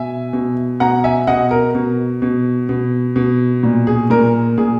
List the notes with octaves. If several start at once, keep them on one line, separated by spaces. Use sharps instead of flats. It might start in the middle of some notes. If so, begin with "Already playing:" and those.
Already playing: B2 E5 G#5
B2
B2 F#5 A#5
E5 G#5
B2 D#5 F#5
A#4
B2
B2
B2
B2
A#2
G#4
A#2 A#4
A#2 G#4